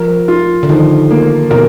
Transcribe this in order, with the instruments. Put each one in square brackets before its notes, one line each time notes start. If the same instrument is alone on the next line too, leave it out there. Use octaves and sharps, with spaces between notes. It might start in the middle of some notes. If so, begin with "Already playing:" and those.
Already playing: [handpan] F3 [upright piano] A#4
[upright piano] F4
[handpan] D3
[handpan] D#3 [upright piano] F3
[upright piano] A#3
[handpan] B2 [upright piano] A#4